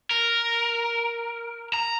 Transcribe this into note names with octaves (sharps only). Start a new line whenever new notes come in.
A#4
A#5